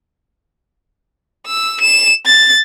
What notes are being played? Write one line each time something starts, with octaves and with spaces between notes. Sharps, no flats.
E6
E7
A6